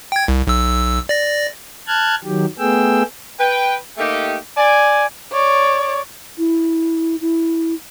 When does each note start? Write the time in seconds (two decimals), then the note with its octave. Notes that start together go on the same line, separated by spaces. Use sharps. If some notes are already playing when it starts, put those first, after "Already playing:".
0.12 G5 G#6
0.28 C2
0.47 B1 E6
1.09 D5 A#6
1.87 A5 F6 F#6 G#6
2.24 D#3 F#3 G4
2.59 A3 B3 G#4 G5 E6
3.38 B4 G5
3.98 A3 A#3 D#4 G4
4.56 D5 G#5
5.32 C#5 D5
6.38 E4
7.21 E4